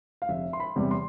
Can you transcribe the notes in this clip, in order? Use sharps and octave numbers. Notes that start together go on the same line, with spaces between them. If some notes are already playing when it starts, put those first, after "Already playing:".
F5
F1 E5
C6
B5
E2 C3 G3
C6